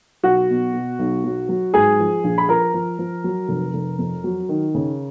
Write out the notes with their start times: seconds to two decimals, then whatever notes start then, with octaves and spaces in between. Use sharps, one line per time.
0.23 B1 F#4 F#5
0.49 B2
0.74 B2
0.99 B1
1.24 F#3
1.49 F#3
1.74 G#2 G#4 G#5
1.99 F3
2.24 A#1
2.38 B5
2.48 F3 A#4 A#5
2.74 F3
2.99 F3
3.24 F#3
3.49 F1
3.74 F1
3.99 F2
4.24 F#3
4.49 D#3
4.74 C#3